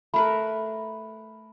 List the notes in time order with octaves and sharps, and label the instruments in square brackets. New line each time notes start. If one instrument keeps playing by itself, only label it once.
[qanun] A3 A#4 B4 [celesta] B5